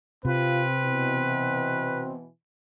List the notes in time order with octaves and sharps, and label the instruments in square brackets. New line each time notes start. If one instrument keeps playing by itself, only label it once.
[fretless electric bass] C3 [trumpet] C4 [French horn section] F4 [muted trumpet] B4
[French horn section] B2 E3